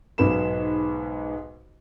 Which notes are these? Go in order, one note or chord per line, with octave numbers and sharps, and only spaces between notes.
B1 G#2 B3 B5 E7